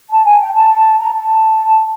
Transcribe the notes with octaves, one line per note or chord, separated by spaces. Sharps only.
A5
G#5
G5
A5
A#5
A5